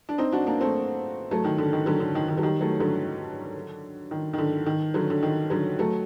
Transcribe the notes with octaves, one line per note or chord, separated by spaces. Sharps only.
D4
C4 D#4
D4 F#4
A#3 D4
A3 C4
F#3 A3
D#3
D3
D#3
D3 F#3
D3
D#3
D#3
F#3
D#3 G3
F#3 A3
D3 F#3
D#3
D#3
D3
D#3
D3 F#3
D3
D#3
D3 F#3
F#3 A3